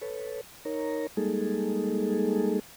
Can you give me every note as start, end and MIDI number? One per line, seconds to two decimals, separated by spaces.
0.02 0.41 69
0.02 0.41 71
0.02 0.41 73
0.65 1.07 63
0.65 1.07 70
0.65 1.07 73
0.65 1.07 82
1.17 2.59 55
1.17 2.59 56
1.17 2.59 58
1.17 2.59 63
1.17 2.59 68
1.17 2.59 69